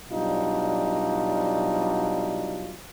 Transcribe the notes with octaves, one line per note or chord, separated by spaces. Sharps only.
B2 F#3 G3 D4 D#4 F4